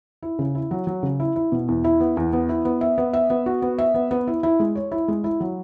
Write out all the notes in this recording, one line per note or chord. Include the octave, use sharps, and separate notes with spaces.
E4
C#3
E4
F#3
F#3
C#3
E4
E4
B2
E2
E4
B3
E2
B3
E4
B3
E5
B3
E5
B3
F#4
B3
E5
B3
B3
E4
E4
G#3
C#5
E4
G#3
E4
F#3